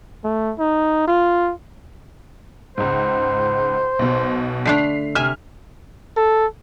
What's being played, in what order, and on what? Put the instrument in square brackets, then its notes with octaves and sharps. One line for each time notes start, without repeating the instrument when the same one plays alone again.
[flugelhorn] A3
D#4
F4
[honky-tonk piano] C#2 G#2 [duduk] C5
[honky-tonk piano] B1 B2
[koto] D3 A3 D4 [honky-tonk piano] B6 C7 F7
[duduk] C3 [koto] E5 G#5 [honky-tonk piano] F6
[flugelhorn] A4